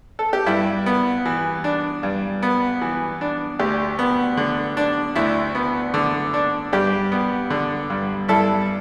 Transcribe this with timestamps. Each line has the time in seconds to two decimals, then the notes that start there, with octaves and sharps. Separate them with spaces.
0.19 A4
0.33 G4
0.46 G2 E4
0.86 B3
1.26 E3
1.64 D4
2.03 G2
2.42 B3
2.82 E3
3.21 D4
3.59 D2 G4
3.99 B3
4.37 D3
4.77 D4
5.16 D2 E4
5.55 B3
5.94 D3
6.34 D4
6.73 G2 G4
7.12 B3
7.50 D3
7.90 G2
8.28 G2 E4 A4